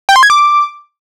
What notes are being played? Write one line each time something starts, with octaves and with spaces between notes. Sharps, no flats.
G5
C6
G#6
D6